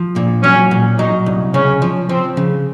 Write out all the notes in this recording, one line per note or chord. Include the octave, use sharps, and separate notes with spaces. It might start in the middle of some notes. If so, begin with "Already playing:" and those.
Already playing: F3
A#2
F#3 C#4
A#2
F#3 D#4
C2
C#3 C#4
F3
F3 C4
C#3